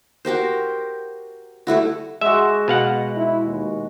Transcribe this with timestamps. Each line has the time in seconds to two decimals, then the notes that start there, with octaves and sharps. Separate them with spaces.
0.25 F#4 G4 A#4 C5
1.67 G3 A3 E4 F#4
2.21 G#3 F#4 E5
2.68 B2 F5 F#5
3.16 E4
3.45 D#2